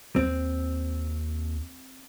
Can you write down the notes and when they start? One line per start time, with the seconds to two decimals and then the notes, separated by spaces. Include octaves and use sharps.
0.16 D#2 C4